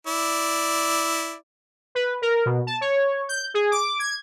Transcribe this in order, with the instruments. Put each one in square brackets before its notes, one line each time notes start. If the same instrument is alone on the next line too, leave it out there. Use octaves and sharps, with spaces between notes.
[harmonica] E4 D5
[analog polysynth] B4
A#4
B2
A5
C#5
G6
G#4
D6
G#6